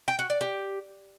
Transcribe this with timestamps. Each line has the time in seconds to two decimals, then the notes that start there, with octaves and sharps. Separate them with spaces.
0.08 G5
0.19 F#4
0.30 D5
0.41 G4